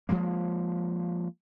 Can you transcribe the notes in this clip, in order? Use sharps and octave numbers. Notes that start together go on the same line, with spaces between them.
F3 F#3 G#3 A#3